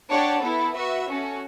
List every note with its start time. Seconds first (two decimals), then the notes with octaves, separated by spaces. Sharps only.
0.10 D4 G4 C#5 F#5 A5
0.42 B3 E4 A4
0.76 F#4 B4 E5
1.07 C#4 F#4 A4